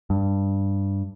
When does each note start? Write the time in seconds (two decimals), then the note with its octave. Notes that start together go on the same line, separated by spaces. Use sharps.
0.10 G2